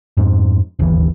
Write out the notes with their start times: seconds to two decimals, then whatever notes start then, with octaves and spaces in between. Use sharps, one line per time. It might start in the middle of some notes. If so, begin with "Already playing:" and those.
0.17 F2 G#2
0.79 D1 G1 D#2 E3